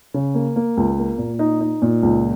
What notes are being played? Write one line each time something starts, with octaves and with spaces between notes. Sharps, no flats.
C#3
A#3
A#3
C#2
A#3
A#2
D#4
D#4
A#2
C#2